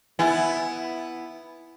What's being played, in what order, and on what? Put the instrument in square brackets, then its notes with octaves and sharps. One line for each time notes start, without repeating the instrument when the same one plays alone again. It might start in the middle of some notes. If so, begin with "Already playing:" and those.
[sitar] B3 E4 [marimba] E5 G#5